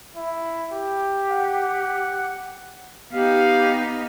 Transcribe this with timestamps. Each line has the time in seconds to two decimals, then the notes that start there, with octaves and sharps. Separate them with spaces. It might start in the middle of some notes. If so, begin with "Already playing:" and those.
0.16 E4
0.73 G4
1.30 F#5
3.14 B3 D#4 G4 F5